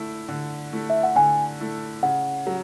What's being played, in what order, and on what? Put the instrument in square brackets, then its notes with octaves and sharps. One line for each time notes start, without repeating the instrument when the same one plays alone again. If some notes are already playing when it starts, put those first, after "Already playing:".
Already playing: [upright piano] D3 A3 E4
D3
A3 E4
[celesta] E5
F#5
[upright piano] D3 [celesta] G#5
[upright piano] A3 E4
[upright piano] C#3 [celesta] F#5
[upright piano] F#3